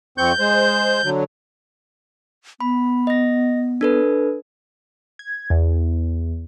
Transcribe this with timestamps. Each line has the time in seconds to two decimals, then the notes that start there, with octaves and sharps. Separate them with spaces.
0.18 F2 C4 C#6 G6
0.39 G#3 C5
1.04 D3 F#3
2.60 B3 B5
3.07 D#5 A#6
3.81 D4 A4 B4
5.19 G#6
5.50 E2